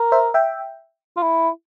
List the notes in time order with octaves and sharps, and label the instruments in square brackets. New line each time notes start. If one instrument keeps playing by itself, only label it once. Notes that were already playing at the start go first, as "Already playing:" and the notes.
Already playing: [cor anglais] A#4
[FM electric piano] C5 E5
E5 G5
[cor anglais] F4
E4